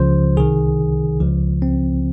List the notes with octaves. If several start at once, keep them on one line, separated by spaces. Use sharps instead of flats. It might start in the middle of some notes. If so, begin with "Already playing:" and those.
Already playing: C#2 C#3 F3 C5
C2 C3 D#3 G#4
C#2 C#3 F3
C4